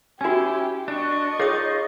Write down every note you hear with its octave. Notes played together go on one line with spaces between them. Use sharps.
C#4 E4 F#4 G4 G#5
D4 D#5 C#6
D#4 F4 G#4 C#5 D#6